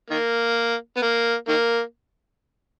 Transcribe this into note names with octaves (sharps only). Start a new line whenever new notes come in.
D#3 A#3
B3
A#3
D#3 A#3